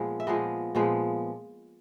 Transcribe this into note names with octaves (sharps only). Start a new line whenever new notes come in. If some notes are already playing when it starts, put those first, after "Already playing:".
Already playing: A#2 F3 G#3 B3
E5
A#2 F3 G#3 B3 D#5
A#2 F3 G#3 B3